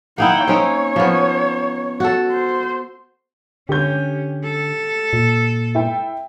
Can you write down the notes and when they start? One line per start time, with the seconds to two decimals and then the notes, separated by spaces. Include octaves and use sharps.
0.18 A#3 D#4 E4 F#5 G5
0.48 C4 C#4 D#4 C#5
0.96 F3 B3
2.00 F#4 A4
2.31 C5
3.69 D3 C#4 G4 G6
4.44 A4
5.13 A#2
5.75 E4 G5